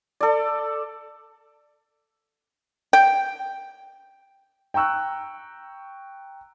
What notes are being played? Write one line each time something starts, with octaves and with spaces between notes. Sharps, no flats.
A4 D5
G5
G5 A#5 C#6 E6 F#6